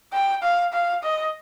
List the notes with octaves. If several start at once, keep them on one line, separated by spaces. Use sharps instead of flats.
G5
F5
F5
D#5